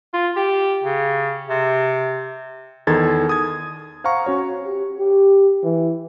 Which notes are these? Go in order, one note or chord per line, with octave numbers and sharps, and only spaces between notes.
F4
G4
C#3
C3
E2 D#3 A4 G#6 A6
D#6 G#6
C5 F5 F#5 A#5 C#6
C#4 F#4 C#5
G4
G4
E3